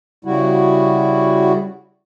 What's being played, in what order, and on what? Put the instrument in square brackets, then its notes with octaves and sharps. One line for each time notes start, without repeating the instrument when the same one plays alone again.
[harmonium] C#3 G3 E4 F#4